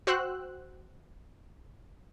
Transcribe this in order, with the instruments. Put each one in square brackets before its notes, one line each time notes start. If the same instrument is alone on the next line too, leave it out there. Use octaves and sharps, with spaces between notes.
[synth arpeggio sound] F#4 C5 G5 E6 F#6